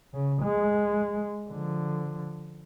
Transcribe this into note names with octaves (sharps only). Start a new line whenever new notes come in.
C#3
G#3
D3 F3